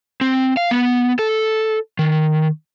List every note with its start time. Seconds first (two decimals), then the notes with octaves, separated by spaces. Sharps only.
0.21 C4
0.57 F5
0.71 B3
1.19 A4
1.99 D#3